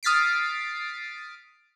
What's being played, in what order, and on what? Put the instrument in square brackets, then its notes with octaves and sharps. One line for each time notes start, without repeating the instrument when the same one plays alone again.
[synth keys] D#6 F6 A6 B6 C7 D7